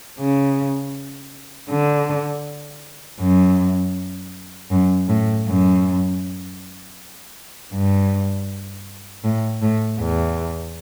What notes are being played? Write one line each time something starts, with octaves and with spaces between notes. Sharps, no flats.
C#3
D3
F#2
F#2
A2
F#2
G2
A2
A2
E2